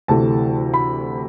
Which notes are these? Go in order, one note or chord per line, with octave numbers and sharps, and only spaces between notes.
D2 C3 E3 A3 A5
B5